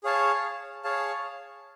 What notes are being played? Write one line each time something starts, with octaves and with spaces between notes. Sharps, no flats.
G#4 C#5 F5 A5
G#4 C#5 F5 A5